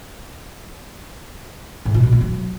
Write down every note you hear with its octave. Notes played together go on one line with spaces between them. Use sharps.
G#2
A#2
B2
A3
F#3